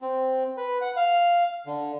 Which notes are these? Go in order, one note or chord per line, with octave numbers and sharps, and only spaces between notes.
C4
B4
F#5
F5
D3